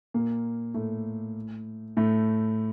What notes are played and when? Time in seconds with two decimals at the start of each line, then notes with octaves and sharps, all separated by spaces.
0.14 A#2 A#3
0.74 A2 A3
1.97 A2 A3